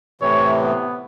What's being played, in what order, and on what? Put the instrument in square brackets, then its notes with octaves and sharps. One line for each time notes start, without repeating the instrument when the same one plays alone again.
[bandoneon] A2 C3 E3 [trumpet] C#5
[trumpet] B3